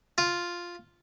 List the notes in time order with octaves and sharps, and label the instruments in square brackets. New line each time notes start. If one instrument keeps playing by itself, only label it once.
[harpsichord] F4